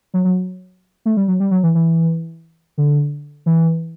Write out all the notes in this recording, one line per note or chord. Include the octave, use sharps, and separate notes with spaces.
F#3
F#3
A3
G3
F#3
G3
F#3
E3
E3
D3
E3